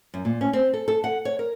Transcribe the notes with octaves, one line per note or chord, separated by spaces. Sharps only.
F#2
A#2
C#4
C4
A4
A4
F#5
C#5
A#4